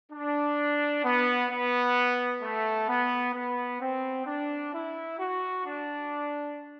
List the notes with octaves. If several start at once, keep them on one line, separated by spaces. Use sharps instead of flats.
D4
B3
B3
A3
B3
B3
C4
D4
E4
F#4
D4